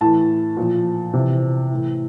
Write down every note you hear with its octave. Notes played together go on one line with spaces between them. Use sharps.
A2 E3 A5
A#2 F3
C3 E3
A2 E3